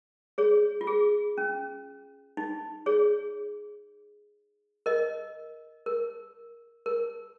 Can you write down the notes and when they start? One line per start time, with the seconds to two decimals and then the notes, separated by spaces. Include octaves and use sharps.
0.38 G#4 C#5
0.81 F4
0.87 G#4
1.38 C#4
2.37 D#4
2.86 G#4 C#5
4.86 A#4 D#5
5.86 A#4
6.86 A#4